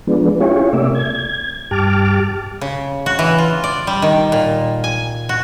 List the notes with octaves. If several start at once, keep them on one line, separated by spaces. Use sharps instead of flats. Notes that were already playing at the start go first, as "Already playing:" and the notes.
F3 G#3 B3 D4
C#4 E4 F4 G4 G#4 C#5
C3 A3 A#3 D5 E5
G#6
G2 G4 A5 D6 F6
C#3
F#4
E3
F4
D5
G3
D#3
A#2
G#5
F#4